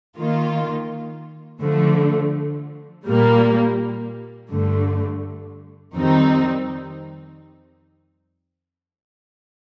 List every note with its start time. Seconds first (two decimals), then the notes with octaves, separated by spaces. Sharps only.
0.18 D#3 A#3 F4
1.62 D3 F3 A3
3.07 A#2 G3 A#3
4.50 G2 D3 A3
5.95 F2 D#3 G3 C4 D#4